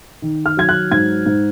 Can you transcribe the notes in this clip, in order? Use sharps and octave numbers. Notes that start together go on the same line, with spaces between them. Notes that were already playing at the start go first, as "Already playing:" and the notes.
D#3
F6
F#3 G#6
F#6
G#2 G#6
G#2